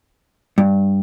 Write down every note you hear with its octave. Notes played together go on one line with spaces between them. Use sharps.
G2